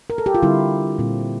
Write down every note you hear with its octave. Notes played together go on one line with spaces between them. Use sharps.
A#4
A4
G4
F4
D3 G3 C4 E4
A#2 G3 C4